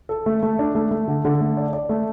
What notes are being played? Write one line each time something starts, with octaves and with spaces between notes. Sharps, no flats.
A4
A3
A3
D4
A3
A3
D3
D3
A3
D5
D5
A3